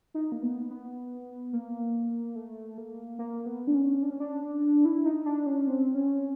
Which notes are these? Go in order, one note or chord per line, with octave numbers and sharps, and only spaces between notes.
D#4
A#3
B3
B3
A#3
A3
A#3
A#3
B3
D4
C#4
D4
C#4
D4
E4
D#4
D4
C#4
C4
C#4